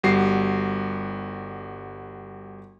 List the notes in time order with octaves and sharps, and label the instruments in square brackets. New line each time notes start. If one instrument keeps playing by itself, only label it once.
[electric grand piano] G1 G3 F#4 C7